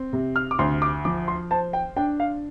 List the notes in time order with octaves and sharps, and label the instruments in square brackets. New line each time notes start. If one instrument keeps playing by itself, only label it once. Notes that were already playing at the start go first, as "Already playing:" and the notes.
Already playing: [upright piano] C4
C3
[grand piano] F6
D6
[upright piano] D2 [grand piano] C6
[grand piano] D6
[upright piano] F3 [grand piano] D6
[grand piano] C6
[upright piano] C5 [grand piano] A5
[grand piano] G5
[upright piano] D4 [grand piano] G5
[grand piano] F5